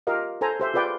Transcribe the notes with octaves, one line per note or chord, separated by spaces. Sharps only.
F4 G4 A#4 D#5 F5
A4 C5 G#5 A#5
G4 C5 E5
F4 G#4 B4 D5 G5